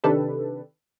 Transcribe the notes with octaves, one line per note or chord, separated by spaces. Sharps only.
C3 D#3 D4 G4 A4 B4